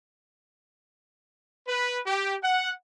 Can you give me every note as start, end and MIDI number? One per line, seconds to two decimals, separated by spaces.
1.68 1.99 71
2.06 2.35 67
2.43 2.71 78